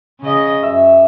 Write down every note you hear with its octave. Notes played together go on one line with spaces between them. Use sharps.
C#3 D#5
F#2 E5